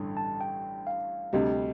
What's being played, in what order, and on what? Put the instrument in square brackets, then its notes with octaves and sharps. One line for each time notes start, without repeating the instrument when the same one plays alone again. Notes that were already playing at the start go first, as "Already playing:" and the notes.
Already playing: [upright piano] A1 G2 D3
[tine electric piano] A5
G5
F5
[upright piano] D2 C3 G3 [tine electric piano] D#5